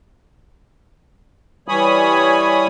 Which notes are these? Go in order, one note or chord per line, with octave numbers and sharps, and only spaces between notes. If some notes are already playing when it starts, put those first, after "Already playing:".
E3 G3 C#5 G#5 B5 D#6